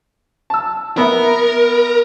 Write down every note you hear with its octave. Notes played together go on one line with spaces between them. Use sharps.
A5 E6
B3 A#4 E5